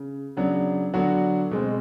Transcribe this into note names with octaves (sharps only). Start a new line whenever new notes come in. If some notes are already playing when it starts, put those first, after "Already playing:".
Already playing: C#3
C#3 F#3 B3 D4
D3 F#3 B3 D4 F#4
B2 G#3 C4